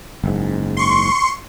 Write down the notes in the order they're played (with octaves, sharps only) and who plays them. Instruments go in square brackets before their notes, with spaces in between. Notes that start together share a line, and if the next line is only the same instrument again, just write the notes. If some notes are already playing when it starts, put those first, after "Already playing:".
[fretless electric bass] F#1 G#2
[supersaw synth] C6 C#6